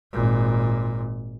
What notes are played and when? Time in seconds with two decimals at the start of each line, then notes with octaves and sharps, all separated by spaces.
0.12 G#1 A#2